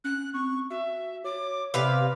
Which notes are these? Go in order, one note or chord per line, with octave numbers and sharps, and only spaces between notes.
C#4 F#6
C4 C#6
F#4 E5
C#5 D6
C3 G4 B4 D5 F5